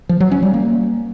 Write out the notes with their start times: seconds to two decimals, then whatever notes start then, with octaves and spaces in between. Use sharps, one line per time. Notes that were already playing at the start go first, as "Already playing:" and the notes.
0.09 F3
0.20 F#3
0.31 C#4
0.43 G3
0.54 A#3